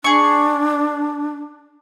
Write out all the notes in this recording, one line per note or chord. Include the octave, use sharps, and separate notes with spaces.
D4 G#4 C#6